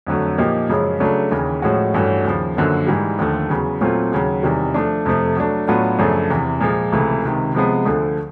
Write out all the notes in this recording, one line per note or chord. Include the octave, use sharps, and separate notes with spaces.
F2 D3 F#3 A3
A#2 F3 A#3 D#4 G4
F#2 C#3 F3 G#3 C#4
C#3 F#3 A3 D4
D#2 C#3 E3
A2 F3 G#3 C#4 F#4
G2 E3 A3 C#4 F#4
D#2 C#3 F3
F#2 D3 F3 A#3
G#2 E3 G3
D#2 D3 F3 A3
E2 C#3 F#3 B3
A#2 F#3 A3 C4 F4
D#2 C#3 F#3
E2 C3 D#3 G3
F3 A3 D4
F2 C3 F3 A3
F#3 A3 D4
A2 F#3 B3 D4 F4
F#2 C#3 F3 A3 D4
E2 C3 E3
A#2 F3 G#3
C#2 C3 E3 A3
C#2 C3 D#3
C3 F3 G#3 B3
D2 D3 F3 A3